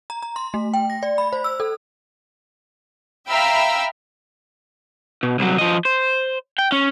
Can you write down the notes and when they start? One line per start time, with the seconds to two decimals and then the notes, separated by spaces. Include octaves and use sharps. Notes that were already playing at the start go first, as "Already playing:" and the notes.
0.10 A#5
0.22 A#5
0.36 C6
0.54 A3
0.74 G5
0.90 A#6
1.03 D5
1.18 B5
1.33 C5
1.44 E6
1.60 A4
3.29 E5 F5 G5 A#5 B5 E6
5.23 B2
5.39 C2 F#3
5.58 F3 D#5
5.85 C5
6.58 G5
6.72 C#4